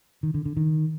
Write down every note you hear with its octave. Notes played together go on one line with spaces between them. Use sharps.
D#3
D3
D3
D#3